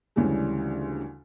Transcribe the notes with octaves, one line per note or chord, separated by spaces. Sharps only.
D2 C#3 E3 G3 G#3